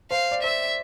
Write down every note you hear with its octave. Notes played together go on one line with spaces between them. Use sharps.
C5 F5
D5
C5 E5